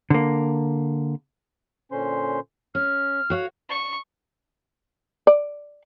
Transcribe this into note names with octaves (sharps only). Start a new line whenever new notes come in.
D3 A#3
A#2 D3 C#4 C5 C6
C#4 F6
F#4 C#5 F5
C#6
D5